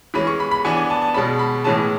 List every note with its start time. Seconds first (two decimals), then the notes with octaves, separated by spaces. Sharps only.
0.14 E3 G#3 C#4 B5
0.27 C#6
0.40 B5
0.51 B5
0.64 E3 B3 D4 G#5
0.77 G#5
0.90 A5
1.02 A5
1.14 B2 G#3 C#4 B5
1.39 B5
1.64 A2 E3 G#3 C#4 A5